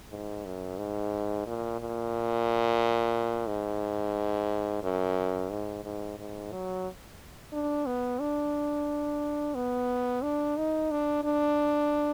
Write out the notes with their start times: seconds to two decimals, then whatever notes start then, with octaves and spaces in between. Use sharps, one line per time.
0.11 G#2
0.45 F#2
0.78 G#2
1.47 A#2
1.80 A#2
3.48 G#2
4.83 F#2
5.51 G#2
5.84 G#2
6.19 G#2
6.52 F#3
7.53 D4
7.86 B3
8.20 D4
9.55 B3
10.23 D4
10.57 D#4
10.91 D4
11.24 D4